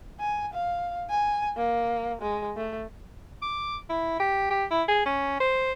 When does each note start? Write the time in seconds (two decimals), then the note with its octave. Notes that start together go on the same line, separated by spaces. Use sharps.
0.20 G#5
0.53 F5
1.10 G#5
1.57 A#3
2.22 G#3
2.57 A3
3.42 D6
3.90 E4
4.20 G4
4.51 G4
4.71 E4
4.88 G#4
5.06 C#4
5.40 C5